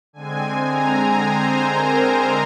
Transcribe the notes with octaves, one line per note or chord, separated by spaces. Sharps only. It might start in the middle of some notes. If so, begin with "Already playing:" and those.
D3 G#3 C4 G#5
A#5
C5
A#4